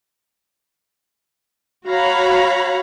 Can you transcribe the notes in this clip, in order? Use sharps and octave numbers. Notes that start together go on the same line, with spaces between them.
F#4 C#5 F5 A#5 B5